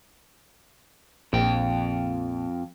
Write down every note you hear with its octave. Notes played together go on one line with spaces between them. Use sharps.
A#1 F2 G5